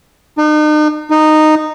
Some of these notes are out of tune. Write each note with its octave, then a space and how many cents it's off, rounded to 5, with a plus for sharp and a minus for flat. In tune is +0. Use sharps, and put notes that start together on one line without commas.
D#4 -40
D#4 -10